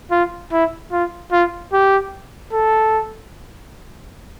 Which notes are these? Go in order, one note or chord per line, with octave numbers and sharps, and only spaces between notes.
F4
E4
F4
F4
G4
A4